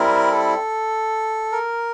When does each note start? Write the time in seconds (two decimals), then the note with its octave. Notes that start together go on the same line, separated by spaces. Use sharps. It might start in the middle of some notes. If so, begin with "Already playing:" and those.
Already playing: G3 C4 E4 A#4
0.31 A4
1.52 A#4